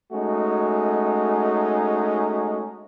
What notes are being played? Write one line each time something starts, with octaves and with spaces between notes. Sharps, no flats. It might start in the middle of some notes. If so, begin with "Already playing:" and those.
G#3 A3 C#4 D#4 F#4